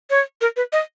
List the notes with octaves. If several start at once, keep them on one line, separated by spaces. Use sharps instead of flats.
C#5
A#4
B4
D#5